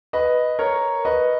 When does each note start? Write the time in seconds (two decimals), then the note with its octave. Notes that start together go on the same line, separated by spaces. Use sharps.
0.13 B4 D#5
0.59 A#4 C#5
1.05 B4 D#5